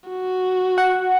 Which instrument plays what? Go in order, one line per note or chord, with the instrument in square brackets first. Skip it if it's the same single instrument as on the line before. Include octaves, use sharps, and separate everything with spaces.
[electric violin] F#4
[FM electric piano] F#5